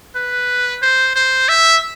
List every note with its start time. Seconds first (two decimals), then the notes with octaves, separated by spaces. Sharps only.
0.16 B4
0.82 C5
1.16 C5
1.49 E5